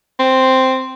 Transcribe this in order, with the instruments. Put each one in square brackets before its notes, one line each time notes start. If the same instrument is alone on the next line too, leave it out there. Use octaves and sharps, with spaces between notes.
[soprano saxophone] C4